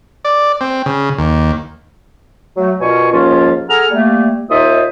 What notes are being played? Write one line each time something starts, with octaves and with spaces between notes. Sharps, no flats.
D5
C4
C#3
D#2
F#3 A3
B2 D4 F4 A#4 G#5 C#6
D#2 G#2 F3 A#3 C#4 F4
G#4 A4 F#5 G#5 A#5 F6
G3 A3 A#3
D#2 D#4 F4 C5 E5 D#6